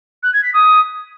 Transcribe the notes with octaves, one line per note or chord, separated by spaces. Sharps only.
F#6
G#6
B6
D#6